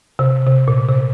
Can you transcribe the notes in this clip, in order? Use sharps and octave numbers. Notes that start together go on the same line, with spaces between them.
C3
C3
A#2
C3